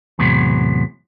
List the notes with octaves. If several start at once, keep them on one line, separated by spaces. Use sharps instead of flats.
E2 A2 C3 F#3